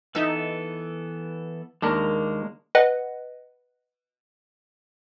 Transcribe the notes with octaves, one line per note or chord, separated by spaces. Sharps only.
E3 B3 D#4 A4 E5
D#2 G#3 A#3 D4 A#4
B4 D#5 F#5